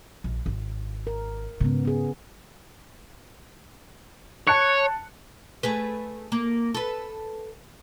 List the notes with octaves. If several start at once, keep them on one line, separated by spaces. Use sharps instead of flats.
A#1
G#1
A#4
G#2 C#3 B3
B3 G#4
C#5 A5 F#6 C#7
A3 G#4 B4
A#3
A4 B4